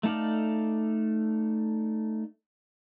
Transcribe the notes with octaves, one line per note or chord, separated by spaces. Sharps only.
A3 D#4 A4 D5 F5